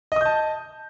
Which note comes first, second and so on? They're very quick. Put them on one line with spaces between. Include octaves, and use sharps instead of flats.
D#5 D#6 G6 A5